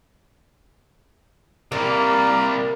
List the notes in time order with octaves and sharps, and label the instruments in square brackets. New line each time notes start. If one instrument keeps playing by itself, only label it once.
[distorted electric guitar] C3 G3 [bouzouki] A#3 [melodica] A#4 D5